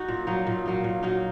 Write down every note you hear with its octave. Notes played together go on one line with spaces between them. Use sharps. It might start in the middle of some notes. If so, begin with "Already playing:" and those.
Already playing: D#4 F#4
A#2
F#3 A#3 D#4
A#2
F#3 A#3 D#4
A#2
F#3 A#3 D#4